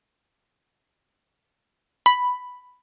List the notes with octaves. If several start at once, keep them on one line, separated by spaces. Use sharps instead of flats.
B5